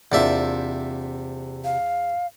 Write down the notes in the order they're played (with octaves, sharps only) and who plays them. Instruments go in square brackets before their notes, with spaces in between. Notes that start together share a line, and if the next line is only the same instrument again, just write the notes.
[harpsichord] E2 D4 E5 [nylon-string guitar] C3 A#3 F4
[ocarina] F5